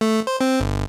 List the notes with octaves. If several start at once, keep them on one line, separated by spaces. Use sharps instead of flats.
A3
C5
C4
G1